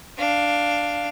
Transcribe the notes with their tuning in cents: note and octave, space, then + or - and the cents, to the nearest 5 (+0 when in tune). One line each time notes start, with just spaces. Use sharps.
D4 +0 F5 +0